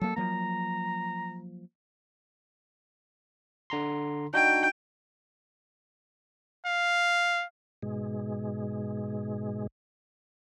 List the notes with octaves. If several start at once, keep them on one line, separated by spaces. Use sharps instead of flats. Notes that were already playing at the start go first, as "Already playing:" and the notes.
F#3 A#3 A4
F3 F#3 A#3 A#5
D3 A#5 C6
D4 D#4 F#4 G5
F5
G#2 B2 G#3